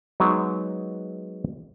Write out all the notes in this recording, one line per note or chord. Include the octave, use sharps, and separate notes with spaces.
F#3 G#3 B3 D#4